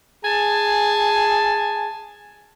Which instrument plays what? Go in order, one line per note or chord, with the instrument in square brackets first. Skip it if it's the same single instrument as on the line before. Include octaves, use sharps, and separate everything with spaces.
[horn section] G#4 G#5 A5